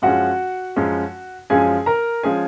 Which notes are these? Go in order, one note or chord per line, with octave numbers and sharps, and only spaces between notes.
F#2 F3 G#3 C#4 F#4 F#5
F#2 F3 G#3 C#4
F#2 F3 G#3 C#4 G#4 G#5
A#4 A#5
F3 G#3 C#4 G#4 G#5